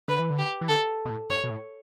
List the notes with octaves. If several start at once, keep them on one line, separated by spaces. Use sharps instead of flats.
D3 B4
E3
D3
G4
E3
D3 A4
B2
A2
G2 C#5
B2
A2